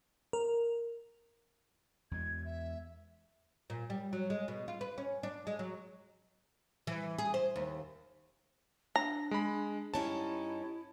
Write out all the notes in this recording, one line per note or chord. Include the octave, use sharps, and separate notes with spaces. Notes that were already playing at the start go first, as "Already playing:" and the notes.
A#4
E2 G#3 G#6
E5
A#2
G3
F#3
G#3
B2
F4
B4
C#4
D4
G#3
F#3
E3
G#4
C5
D#2
D4 A#5
G#3 B5
G2 C#4 D#4 E4 A5